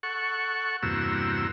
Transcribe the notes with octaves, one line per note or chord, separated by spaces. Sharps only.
A4 F#5 C#6
E2 G2 C3 A#3 F#4 E6